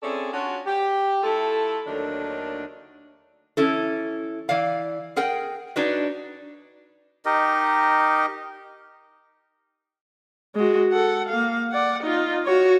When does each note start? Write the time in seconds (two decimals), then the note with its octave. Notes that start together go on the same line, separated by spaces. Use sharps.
0.02 C4 C#4 E4 G#4 A4 D5
0.32 C#4 D4 F4 F#4
0.66 G4
1.23 A3 E4 F4 A4
1.86 D#2 D3 D#3 F#3 A3 D4
3.57 E3 C#4 E4 A4
4.49 E3 D5 F5
5.16 G#4 A#4 F#5 G5
5.76 D4 D#4 F#4 B4 C#5 D#5
7.25 D#4 G4 A#4 D#5
10.55 G#3 F#4
10.92 A4 F#5
11.29 A#3 F5
11.72 D5 F#5
12.03 D#4 F4
12.45 F#4 C#5